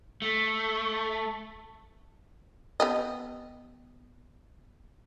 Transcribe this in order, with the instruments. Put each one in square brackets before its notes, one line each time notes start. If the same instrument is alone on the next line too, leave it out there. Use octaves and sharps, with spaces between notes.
[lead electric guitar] A3
[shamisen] B3 G4 D#5